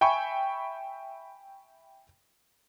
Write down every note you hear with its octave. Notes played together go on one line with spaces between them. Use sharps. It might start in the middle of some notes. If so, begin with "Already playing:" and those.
E5 G5 G#5 B5 C#6